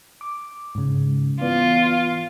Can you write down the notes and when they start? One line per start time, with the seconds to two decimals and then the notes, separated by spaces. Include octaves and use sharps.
0.21 D6
0.75 G#2 C#3
1.41 E3 B3 F4 D5